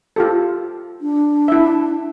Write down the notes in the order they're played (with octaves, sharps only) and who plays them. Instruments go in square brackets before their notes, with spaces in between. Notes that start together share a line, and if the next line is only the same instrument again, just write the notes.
[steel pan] F4 G4 A4
[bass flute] D4
[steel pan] E4 E5